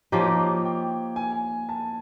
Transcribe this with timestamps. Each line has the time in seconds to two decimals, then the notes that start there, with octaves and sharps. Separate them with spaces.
0.12 F3 A#3 D#4 G4 C#5
0.65 G5
1.16 G#5
1.69 A5